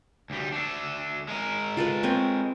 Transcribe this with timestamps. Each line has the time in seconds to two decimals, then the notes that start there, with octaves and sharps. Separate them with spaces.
0.30 D2 G3
0.52 A3 D4
1.29 G#3 A#4
1.77 F4 A4 B4
2.03 C4 B4 C#5